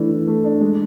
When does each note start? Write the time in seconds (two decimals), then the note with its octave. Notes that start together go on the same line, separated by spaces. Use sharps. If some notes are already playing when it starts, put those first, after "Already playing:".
Already playing: E3 A3 D4
0.11 E3
0.27 A3
0.44 D4
0.61 G#3